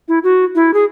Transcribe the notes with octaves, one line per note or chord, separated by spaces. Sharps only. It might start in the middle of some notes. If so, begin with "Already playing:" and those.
E4
F#4
E4
G#4